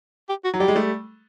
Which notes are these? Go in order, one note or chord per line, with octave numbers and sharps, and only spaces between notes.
G4
F#4
F#3
G3 G4
G#3
G3 A3